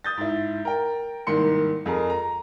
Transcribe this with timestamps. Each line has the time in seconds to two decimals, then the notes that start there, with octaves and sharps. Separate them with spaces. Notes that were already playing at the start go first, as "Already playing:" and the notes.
0.04 D#6 G6 A6
0.17 G#2 E4
0.65 A#4 G5
1.27 C2 G#2 D#3 A#3 C6 C#7
1.86 F2 G#4 A#4
2.10 A#5